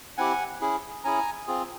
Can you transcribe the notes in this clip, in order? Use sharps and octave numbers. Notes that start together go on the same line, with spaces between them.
C4 E4 G4 F#5 G#5
C#4 E4 G#4
C#4 E4 G#4 G#5 A#5
C4 F4 G#4